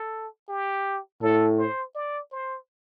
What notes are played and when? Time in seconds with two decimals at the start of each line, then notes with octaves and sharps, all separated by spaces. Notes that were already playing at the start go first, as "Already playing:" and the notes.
Already playing: A4
0.49 G4
1.21 A2 A4
1.58 C5
1.95 D5
2.32 C5